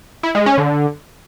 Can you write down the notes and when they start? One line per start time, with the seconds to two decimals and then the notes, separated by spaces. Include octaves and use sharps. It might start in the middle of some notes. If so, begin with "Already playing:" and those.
0.23 E4
0.35 G#3
0.46 C#4
0.58 D3